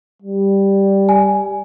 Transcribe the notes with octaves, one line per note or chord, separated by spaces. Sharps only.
G3
G#5